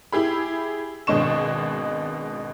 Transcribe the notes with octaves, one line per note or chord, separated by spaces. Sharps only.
E4 G4 G#4 B5
G#1 B2 G#3 D4 C#6 E7